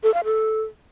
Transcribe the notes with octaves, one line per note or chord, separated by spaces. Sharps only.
A4
F5
A4